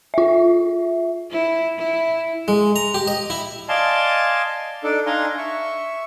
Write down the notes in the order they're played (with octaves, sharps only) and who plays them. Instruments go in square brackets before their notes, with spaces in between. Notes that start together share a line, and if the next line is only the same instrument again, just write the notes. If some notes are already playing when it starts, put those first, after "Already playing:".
[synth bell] F4 E5
[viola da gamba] E4
E4
[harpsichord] G#3
A#5
G4
D#5
E4
[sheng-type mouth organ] D5 D#5 F5 G#5 A5 C6
D4 D#4 A4 D5
D4 D#4 F5 G#5 A#5 C6
E5 C#6